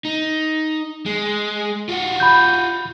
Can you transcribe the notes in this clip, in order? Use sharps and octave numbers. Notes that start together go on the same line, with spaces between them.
D#4
G#3
F4 F#4
B5 G6